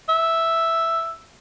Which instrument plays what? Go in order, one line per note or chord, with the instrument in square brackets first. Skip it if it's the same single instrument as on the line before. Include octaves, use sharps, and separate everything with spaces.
[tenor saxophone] E5